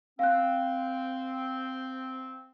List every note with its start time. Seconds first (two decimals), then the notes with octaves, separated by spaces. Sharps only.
0.19 C4 F5 F#6